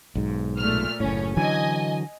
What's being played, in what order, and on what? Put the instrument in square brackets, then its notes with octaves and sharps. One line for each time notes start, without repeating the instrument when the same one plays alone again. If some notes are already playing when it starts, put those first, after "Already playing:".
[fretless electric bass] B1 G#2
[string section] A#2 A3 F6
[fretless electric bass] F#1 A2 [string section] C#4
[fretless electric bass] D3 E3 F#3 [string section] D#5 G#5